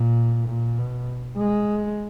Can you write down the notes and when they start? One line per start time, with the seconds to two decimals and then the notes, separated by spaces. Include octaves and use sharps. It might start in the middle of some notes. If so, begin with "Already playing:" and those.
Already playing: A#2
0.48 A#2
0.78 B2
1.37 G#3